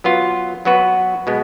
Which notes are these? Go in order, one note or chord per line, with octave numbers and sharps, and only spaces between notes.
F#3 B3 F4
F#3 B3 F#4 B4
B2 G#3 B3